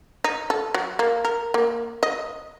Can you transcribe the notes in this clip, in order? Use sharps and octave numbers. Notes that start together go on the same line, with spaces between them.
D#4
A4
F#3
A#3
A#4
A#3
D#5